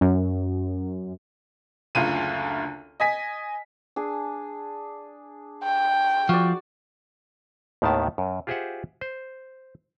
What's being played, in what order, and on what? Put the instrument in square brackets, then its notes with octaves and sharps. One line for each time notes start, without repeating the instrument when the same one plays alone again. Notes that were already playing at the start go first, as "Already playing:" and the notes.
[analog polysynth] F#2
[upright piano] F#1 D2 F4 D#7
D#5 G#5 B6
[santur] D4 G#4
[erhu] G5
[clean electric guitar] F3 [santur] F#4 D5
[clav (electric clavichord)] D#2 A2 D#3 B3 A5
F#2
F4 G4 G#4 C5 E5 F#5
C5